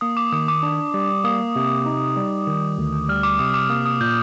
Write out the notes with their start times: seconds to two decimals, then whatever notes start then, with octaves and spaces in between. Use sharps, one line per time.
0.01 A#3 D#6
0.17 D6
0.32 D#3 D#6
0.48 D6
0.63 D4
0.94 G3
1.24 A#3 D#6
1.56 C3
1.86 D#4
2.16 G3
2.47 D#3
2.78 D2
3.09 G3 F6
3.23 D6
3.39 C3 D#6
3.54 D6
3.70 A#3 D#6
3.86 D#6
4.01 A#2 G6